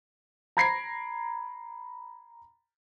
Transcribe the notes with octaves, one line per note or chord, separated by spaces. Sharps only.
A#5 B5 G#6 A#6 C7 D7